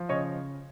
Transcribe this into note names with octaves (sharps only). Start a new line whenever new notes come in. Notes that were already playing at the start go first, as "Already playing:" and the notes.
Already playing: F3
C#3 C#5 D#5